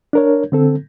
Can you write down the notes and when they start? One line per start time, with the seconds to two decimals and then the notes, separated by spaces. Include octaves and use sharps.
0.13 D4 A#4 C#5
0.52 D3 C4 A4